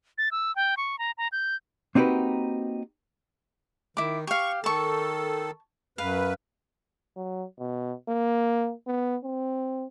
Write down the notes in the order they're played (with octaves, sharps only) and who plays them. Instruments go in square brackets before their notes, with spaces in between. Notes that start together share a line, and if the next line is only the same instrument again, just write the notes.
[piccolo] A6
E6
G5
C#6
A#5
A#5
G6
[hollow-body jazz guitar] A#3 C4 D#4 F#4 G4 B4
[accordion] D#3 [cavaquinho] E4 D6
[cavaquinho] G4 F5 [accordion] C#6
[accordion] D#3 A4 [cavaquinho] A5 C#6
[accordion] F#2 B4 [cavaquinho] F5
[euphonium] F#3
B2
A#3
B3
C4